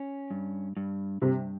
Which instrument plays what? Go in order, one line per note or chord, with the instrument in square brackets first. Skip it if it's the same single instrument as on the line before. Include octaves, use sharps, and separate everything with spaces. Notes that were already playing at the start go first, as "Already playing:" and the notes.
Already playing: [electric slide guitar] C#4
G2
G2
[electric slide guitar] G2 [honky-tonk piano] C3